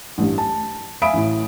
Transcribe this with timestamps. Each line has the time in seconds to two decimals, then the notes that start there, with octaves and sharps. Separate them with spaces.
0.18 A1 G2
0.38 A5
1.02 E5 F5 G#5 B5 D#6 D7
1.13 A1 A2